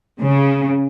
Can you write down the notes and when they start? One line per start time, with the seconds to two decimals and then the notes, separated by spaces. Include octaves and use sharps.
0.22 C#3